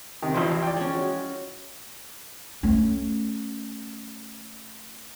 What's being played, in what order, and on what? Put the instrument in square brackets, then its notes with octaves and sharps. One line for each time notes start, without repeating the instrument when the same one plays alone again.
[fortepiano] C3 D#3
[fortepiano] A1 E4 C5 [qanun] E3 F3 D#5
[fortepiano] D5 G5
[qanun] G#3 C#4
F#4
[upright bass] A3 C#4